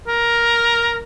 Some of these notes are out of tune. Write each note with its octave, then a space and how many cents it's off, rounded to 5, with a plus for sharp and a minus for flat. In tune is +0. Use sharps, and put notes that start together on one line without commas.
A#4 +10